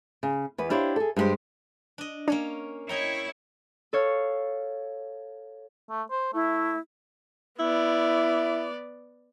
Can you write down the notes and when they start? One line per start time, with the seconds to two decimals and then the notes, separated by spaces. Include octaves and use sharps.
0.23 C#3
0.58 E2 B4
0.70 D4 E4 G4 C5 C#5 F5
0.96 G#4 A4
1.16 G2 G#3 D#4 G4 C5
1.98 D4 D#5
2.28 A#3 C#4 D4 C#5
2.89 E4 C#5 D#5 G5 A#5
3.93 A4 C#5 F5
5.90 A3
6.11 C5
6.34 A3 E4
7.59 B3 E4 D5